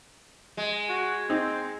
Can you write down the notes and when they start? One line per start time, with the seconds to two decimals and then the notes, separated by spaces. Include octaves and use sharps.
0.57 G#3
0.89 F#4
1.30 C4 D#4